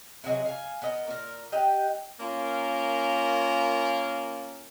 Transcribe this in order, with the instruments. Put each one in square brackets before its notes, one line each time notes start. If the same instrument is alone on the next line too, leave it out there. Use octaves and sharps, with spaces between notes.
[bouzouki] C3 F#3 G#4 D#5
F5 G#5
B3 A#4 D#5
A#2 A#4
G4 D#5 F#5 G5
[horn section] A#3 C#4 F4 A#4